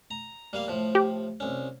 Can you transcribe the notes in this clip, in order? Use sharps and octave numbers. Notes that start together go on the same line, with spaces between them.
A#5
G3 A#3 F5
A2 F3
G4
C2 C#4